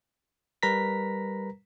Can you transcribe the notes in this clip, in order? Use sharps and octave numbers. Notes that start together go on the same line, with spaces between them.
G3 A#4 B4 A#5 A#6 B6